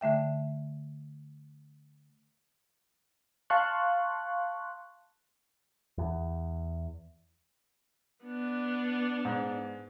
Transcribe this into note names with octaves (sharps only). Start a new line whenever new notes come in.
D3 A3 E5 G5
F5 A5 C6 C#6 F#6
E2
B3 D4
G#2